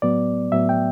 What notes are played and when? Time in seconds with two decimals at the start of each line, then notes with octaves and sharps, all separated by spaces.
0.02 A2 F#3 B3 D5
0.52 A2 F#3 B3 E5
0.69 G5